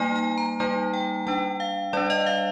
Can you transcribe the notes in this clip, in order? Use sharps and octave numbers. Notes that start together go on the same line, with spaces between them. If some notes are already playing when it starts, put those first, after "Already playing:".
Already playing: G3 A#3 D#4 G#5
G#5
A#5
G3 A#3 D#4 G#5
G5
G3 D4 G5
F5
G3 D4 D5
D#5
F5